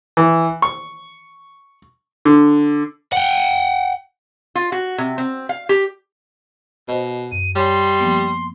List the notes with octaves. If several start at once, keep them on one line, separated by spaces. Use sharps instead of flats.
E3
C#6
D3
F#5 G5
F4
F#4
C3
C4
F5
G4
B2 C5 D#5
F#2 D#7
G3 C#5 G#5 C6
F3 A#3 B3